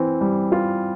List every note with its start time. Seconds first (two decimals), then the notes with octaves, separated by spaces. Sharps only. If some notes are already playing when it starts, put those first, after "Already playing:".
Already playing: E3 C4
0.21 G3
0.52 F4